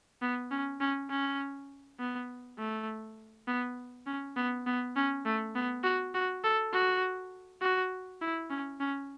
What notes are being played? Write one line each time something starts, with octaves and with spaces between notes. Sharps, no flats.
B3
C#4
C#4
C#4
B3
A3
B3
C#4
B3
B3
C#4
A3
B3
F#4
F#4
A4
F#4
F#4
E4
C#4
C#4